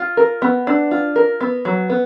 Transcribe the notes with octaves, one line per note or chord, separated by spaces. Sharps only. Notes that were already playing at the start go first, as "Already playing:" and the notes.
Already playing: F4
A#4
B3
D4
F4
A#4
B3
F#3
B3